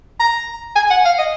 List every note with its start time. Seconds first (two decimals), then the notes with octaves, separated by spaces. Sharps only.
0.19 A#5
0.76 G#5
0.90 F#5
1.05 F5
1.18 D#5